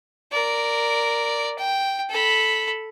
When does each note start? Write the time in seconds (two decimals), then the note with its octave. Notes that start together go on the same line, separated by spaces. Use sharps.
0.32 A#4 D5
1.58 G5
2.09 A4 B5